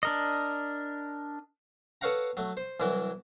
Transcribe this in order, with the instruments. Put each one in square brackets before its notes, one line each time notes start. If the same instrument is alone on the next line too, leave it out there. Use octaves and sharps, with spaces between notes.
[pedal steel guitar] D4 A#4 D#5
[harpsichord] A4 B4 C#5 F5 F#5 A#5
F#3 A3
C5
C2 E3 F#3 E4